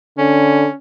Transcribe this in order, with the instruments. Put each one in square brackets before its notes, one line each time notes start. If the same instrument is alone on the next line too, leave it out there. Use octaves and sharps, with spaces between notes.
[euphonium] D3 [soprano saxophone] C#4